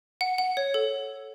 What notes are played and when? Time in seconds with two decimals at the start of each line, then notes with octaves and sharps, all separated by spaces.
0.21 F#5
0.38 F#5
0.57 C#5
0.74 A4